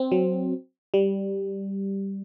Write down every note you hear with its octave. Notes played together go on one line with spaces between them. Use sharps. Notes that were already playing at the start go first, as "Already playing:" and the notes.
Already playing: C4
F#3
G3